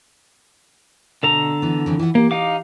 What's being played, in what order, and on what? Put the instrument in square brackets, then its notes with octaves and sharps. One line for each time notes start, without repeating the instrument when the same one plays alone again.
[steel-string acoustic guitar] B2 [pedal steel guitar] D3 A4 A#5
[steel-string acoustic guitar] E3 B3
C#3 E3 C4
E3 F4 F#5
[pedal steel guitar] A#3 [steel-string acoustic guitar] G4
[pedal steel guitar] D#4 F5 D6